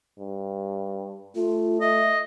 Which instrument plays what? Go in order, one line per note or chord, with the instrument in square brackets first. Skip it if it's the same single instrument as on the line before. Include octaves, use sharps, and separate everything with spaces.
[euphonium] G2
[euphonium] A3 [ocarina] F4
[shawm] D#5 [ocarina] E5